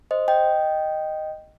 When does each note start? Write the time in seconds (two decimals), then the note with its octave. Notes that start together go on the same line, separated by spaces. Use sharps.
0.11 C5 D#5
0.28 D#5 G5